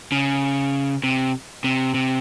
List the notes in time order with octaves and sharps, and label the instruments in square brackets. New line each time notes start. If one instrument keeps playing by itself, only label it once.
[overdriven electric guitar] C#3
C3
C3
C3